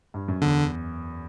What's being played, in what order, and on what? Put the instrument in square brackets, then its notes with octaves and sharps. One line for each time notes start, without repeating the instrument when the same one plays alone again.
[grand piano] G2
F#2
[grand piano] E2 [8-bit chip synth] D3